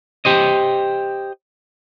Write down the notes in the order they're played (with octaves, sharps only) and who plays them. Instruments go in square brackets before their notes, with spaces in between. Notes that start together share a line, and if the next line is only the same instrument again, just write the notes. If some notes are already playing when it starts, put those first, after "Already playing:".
[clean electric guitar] G4 C5 D#5